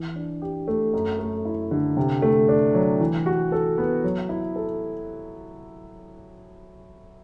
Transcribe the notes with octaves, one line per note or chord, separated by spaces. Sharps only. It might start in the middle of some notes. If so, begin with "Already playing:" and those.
Already playing: E3
D4
G4
A3
F#2
A3
E4
D3
C3
A3
D4
F#3
E3
F#4
A4
B3
F#3
E4
A4